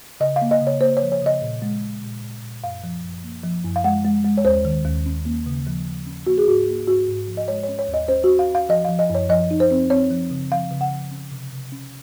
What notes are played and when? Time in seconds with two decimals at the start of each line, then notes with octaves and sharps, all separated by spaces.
0.20 C#3 D#5
0.36 F5
0.41 A#3
0.51 D#5
0.62 C#3
0.67 C#5
0.81 A#3 C5
0.97 C#5
1.02 F3
1.12 C#5
1.22 C#3 D#5
1.42 A#2
1.62 G#3
1.82 A#2
2.03 A#2
2.23 A#2
2.43 A#2
2.64 F#2 F5
2.84 F3
3.03 F#2
3.23 A#3
3.43 F3
3.64 F#2
3.76 F5
3.84 G#3 F#5
4.05 G#3
4.25 G#3
4.37 C#5
4.45 D#2 C5
4.65 D#3
4.85 D#2
5.06 C#4
5.25 A#3
5.46 C#3
5.67 F3
5.87 F3
6.06 C#4
6.26 A#3 F#4
6.38 G#4
6.48 G#2 F#4
6.67 A#3
6.87 G#2 F#4
7.08 G#2
7.27 F3
7.37 D#5
7.48 G#3 C#5
7.63 C#5
7.68 C#4
7.79 C#5
7.88 D#2
7.94 D#5
8.08 C#4 C5
8.24 F#4
8.29 C#4
8.39 F5
8.50 C#4
8.55 F5
8.69 F3 D#5
8.85 F3 F5
8.99 D#5
9.10 F#2 C#5
9.29 F3 D#5
9.51 D#4
9.60 C5
9.71 C4
9.90 C4 C#5
10.11 F3
10.30 C#3
10.51 F3 F5
10.71 C#3
10.81 F#5
10.92 F3
11.12 C#4
11.31 C3
11.52 C3
11.72 C#4